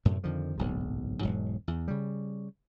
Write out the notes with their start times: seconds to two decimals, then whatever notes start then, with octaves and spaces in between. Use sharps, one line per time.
0.05 F#2 A2 C3 A3
0.24 F2 D3 D#3 F3
0.58 D1 B1 G#2
1.21 E1 G#2 F#3
1.68 E2
1.88 C#3 G3